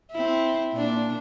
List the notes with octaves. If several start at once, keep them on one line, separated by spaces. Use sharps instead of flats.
C4 E4
A#2 D4